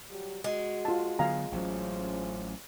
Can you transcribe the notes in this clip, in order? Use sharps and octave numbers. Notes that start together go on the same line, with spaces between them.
F#3 G3 G4
G#3 F#4
F4 A5
D3 F#3 B3 F5 G#5 A#5
A1 F#3 C#4 F4 C5